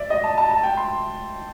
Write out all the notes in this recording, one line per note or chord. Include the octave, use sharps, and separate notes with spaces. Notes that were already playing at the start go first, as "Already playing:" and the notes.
Already playing: D5 E5
D#5
A5
A5
A5
G5
C6